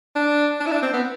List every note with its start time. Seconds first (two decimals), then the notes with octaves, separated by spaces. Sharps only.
0.16 D4
0.60 D4
0.67 E4
0.71 D4
0.82 C4
0.93 B3